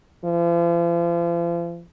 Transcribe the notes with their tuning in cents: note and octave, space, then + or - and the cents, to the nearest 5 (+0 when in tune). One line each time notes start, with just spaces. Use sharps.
F3 -40